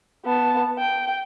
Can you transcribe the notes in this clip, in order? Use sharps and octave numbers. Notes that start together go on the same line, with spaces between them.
B3 A5
G5